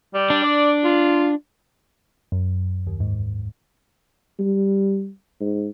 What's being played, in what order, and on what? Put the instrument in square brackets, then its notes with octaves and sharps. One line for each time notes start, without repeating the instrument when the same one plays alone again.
[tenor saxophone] G3
[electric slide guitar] D4
[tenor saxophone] D5
F4
[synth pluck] F#2
D#2
G#2
[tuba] G3
G#2